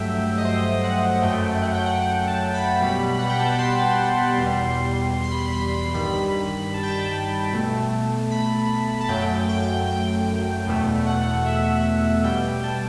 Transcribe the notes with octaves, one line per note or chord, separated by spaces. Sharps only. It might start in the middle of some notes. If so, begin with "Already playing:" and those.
Already playing: G2 F#3 A3 E5 G5
D#5
C5
F#5
F#2 F#3 A3 G5
F#5
G5
F#5
F#5
A5
B5
B2 G3
F#5
G5
A5
B5
C6
E2 B2 G3
C6
B5
C6
B5
G2 D#3 G3 B5
A5
G5
A5
B2 A3
B5
A5
F#2 F#3 A3 G5
G5
G5
E2 B2 A3
F#5
E5
B2 G3 G5
A5